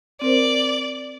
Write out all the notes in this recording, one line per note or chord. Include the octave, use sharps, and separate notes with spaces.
C4 A#4 C5 D5